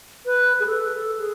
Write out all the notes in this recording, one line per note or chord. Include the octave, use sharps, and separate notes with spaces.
B4
G#4
A4
A4
G#4